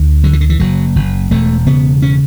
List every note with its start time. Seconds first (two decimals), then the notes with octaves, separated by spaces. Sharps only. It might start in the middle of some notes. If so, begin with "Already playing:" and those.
Already playing: D2
0.24 D3 F#3
0.33 E3
0.41 D3
0.50 E3
0.60 F#1 F#3
0.96 F#1
1.31 E1 A3
1.67 C#3 B3
2.02 C#4